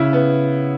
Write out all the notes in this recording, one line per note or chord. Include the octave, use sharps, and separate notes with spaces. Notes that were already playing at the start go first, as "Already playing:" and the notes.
Already playing: C#3 E4
B3